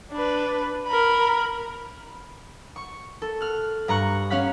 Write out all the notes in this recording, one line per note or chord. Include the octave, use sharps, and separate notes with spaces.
D4 B4
A#4 B5
C#6
A4
F6 F#6
G2 A#5 C#6 F#6
C#4 C#5 F5 F#6 B6